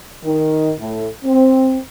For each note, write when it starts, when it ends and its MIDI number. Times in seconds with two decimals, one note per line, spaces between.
0.25 0.71 51
0.80 1.07 45
1.24 1.76 60